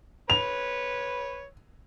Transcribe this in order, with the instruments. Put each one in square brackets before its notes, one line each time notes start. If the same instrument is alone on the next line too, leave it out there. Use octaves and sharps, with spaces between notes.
[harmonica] B4 C#5 [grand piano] F7